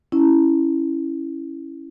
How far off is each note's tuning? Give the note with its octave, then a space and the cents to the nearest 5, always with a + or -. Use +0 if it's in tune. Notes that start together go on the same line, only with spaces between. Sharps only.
C#4 -5 E4 +0